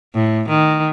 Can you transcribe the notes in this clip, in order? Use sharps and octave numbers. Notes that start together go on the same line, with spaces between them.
A2
D#3